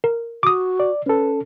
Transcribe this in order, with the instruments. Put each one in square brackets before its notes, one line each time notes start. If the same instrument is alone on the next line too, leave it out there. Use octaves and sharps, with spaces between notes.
[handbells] A#4
[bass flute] F#4 [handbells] D6 D#6
[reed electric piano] D5
[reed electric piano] C#4 A4 [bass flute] B4